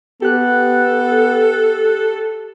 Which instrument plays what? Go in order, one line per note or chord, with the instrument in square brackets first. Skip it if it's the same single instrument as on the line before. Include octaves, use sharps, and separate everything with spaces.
[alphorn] B3 [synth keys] G4 F#6 [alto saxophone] A4